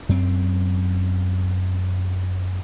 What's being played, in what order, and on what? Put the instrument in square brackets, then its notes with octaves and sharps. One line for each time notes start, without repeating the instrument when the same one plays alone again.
[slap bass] F#2 C4